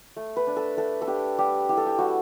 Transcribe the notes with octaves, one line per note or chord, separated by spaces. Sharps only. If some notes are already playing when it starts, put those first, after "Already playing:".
A3
B4
D4
A4
A3 A4
A4
D4 G4
G3 G4
E4 G4
A4
G4
G3 F#4